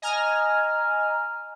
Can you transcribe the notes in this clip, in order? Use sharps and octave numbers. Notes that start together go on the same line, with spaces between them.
D#5 G#5 A#5 F6